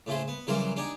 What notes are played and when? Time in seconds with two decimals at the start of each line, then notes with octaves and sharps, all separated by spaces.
0.07 A2 C#3 A3 G#4 C5
0.28 B3
0.47 C#3 E3 F#3 G3 A#4 C5
0.76 D4 D#4 G4 G#5